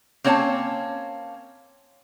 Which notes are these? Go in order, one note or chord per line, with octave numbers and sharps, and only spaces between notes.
A#3 C4 C#4 C#5 F#5 A5